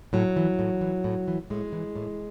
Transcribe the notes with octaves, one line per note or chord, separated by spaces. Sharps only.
A2 F#3
E3
A2
E3
A2
E3
A2 G#3
E3
A2